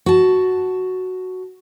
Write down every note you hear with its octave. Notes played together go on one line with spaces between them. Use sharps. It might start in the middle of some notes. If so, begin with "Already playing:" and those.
F#4 A5